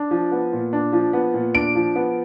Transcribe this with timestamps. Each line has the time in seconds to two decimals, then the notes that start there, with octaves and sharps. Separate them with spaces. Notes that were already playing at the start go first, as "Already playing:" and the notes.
Already playing: D4
0.11 F3
0.32 B3
0.53 A#2
0.73 D4
0.93 F3
1.13 B3
1.34 A#2
1.54 D4 D7
1.75 F3
1.96 B3